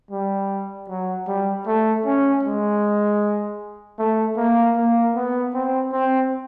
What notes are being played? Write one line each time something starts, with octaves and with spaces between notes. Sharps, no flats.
G3
F#3
G3
A3
C#4
G#3
A3
A#3
A#3
B3
C4
C4